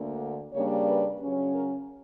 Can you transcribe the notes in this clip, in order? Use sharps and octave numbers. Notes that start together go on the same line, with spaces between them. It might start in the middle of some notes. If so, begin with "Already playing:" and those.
Already playing: D2 D3 A#3
C#3 G3 A#3 D4 C#5
B4
C#3 F#3 C#4
A#4